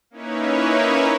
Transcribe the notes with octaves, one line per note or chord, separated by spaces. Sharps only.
A#3 C#4 D#4 E4 B4 C#5